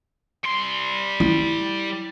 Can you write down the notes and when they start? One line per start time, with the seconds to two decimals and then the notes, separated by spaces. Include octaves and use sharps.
0.45 G3 C6
1.20 E4